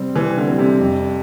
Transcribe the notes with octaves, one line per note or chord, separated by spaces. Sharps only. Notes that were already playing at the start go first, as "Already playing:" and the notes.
Already playing: C3 G3 C4
C3 E3
D3
G3 C4
C3
F2